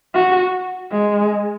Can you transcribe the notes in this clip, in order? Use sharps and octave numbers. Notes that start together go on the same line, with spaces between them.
F#4
G#3